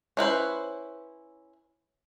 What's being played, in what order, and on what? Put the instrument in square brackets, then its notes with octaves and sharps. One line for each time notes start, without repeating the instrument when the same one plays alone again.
[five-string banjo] C#4 E4 B4 C5